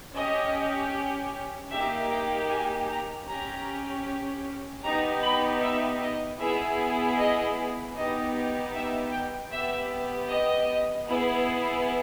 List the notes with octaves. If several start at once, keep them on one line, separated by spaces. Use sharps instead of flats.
C#4 G4 D#5
A#3 D#4 G4 E5
G5
G#5
A#5
C#4 G4 A#5
B3 D#4 G4 A#5
B5
E5
D#5
B3 E4 G#4 E5
D#5
B3 D#4 G4 D#5
E5
G5
B3 G4 E5
D#5
B3 E4 G#4